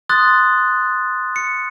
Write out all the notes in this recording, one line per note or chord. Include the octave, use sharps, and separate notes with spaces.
C6 D#6 F#6 A6
C#7